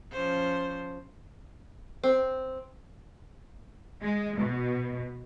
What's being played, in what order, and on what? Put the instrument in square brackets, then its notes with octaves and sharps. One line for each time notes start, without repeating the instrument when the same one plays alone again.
[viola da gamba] F3 C#4 C5
[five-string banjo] C4
[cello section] G#3
B2